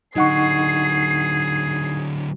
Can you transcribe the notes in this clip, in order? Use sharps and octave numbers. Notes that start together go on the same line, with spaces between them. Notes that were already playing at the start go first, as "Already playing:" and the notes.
D3 F#3 D#4 G#4 F#5 C#6 C7